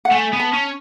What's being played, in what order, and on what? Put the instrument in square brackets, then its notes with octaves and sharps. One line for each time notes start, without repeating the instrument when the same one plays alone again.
[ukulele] F#5
[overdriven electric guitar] A3 [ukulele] G#5
[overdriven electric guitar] B3
[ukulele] A5
[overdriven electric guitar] C#4